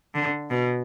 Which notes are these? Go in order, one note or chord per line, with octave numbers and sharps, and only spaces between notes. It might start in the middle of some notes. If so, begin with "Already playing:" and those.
D3
B2